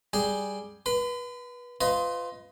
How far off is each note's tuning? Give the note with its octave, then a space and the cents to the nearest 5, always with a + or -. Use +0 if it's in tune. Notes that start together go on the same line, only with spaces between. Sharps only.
G3 +0 G#4 +0 G5 +0
B4 -25 B5 +45
F4 +0 B4 +35 D#5 +15